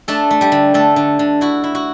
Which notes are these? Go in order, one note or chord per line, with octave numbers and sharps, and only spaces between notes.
A3 D4 A4
A3
G3 G4
D3
D3 A3 A4
D3
D3
E4 F#4
E4
F#4